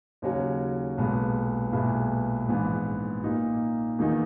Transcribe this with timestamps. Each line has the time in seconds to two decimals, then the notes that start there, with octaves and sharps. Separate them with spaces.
0.22 D#2 C#3 F#3 C#4 F#4
0.98 B1 A#2 G#3 B3
1.73 B1 A#2 G#3 B3 E4
2.48 A#1 G#2 E3 B3
3.23 A#2 A#3 D#4
3.99 E2 D#3 A#3 D#4